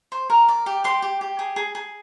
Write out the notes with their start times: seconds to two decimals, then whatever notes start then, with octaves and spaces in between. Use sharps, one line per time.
0.12 C5
0.30 A#4
0.49 D5
0.66 G4
0.84 G4 C6
1.02 G4
1.21 G4
1.39 G#4
1.56 G#4
1.75 G#4